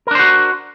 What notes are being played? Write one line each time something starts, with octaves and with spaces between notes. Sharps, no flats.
D4 F#4 A#4 C5